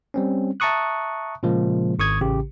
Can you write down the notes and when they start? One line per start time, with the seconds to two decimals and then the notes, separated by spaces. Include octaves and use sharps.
0.14 G3 C4 C#4
0.60 E5 A5 A#5 C#6 D#6 F#6
1.43 A#2 C#3 F3 G#3 A#3
1.99 G#1 C#6 D#6 G#6
2.21 A1 C#3 G4